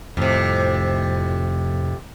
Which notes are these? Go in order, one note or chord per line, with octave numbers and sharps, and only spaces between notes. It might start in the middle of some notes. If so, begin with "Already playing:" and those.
F1 F2 A2 C3